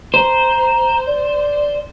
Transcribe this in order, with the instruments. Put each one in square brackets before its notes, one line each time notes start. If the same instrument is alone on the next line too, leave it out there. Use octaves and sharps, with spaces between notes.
[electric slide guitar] C5 [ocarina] A#5
[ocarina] D5